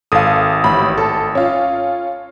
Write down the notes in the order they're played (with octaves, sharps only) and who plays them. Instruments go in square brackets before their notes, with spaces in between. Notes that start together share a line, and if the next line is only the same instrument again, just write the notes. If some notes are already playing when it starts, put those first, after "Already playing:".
[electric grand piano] G#1 D#6 [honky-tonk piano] A4 F5
[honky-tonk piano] A1 B5
A4
C#4 F4